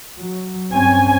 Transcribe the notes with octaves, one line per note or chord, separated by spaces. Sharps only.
F#3
G2 C4 C#4 G#5